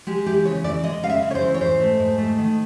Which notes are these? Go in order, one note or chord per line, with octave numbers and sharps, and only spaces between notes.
G#3 G4
E3 G4
C#3 C#5
E3 D5
G#3 D#5
C#3 F5
E5
C#3
C#5
C5
E3
C#5
G#2 C5
A3
G#2
A3
D#3